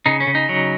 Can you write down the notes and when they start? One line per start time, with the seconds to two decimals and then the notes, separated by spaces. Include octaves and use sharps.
0.06 C#3 D#4
0.20 C#4
0.27 C#3
0.35 D#4
0.49 F#3